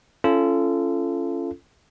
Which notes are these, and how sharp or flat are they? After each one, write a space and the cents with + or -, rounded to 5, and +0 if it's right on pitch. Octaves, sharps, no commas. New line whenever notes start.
C#4 +0 F4 -30 A4 +0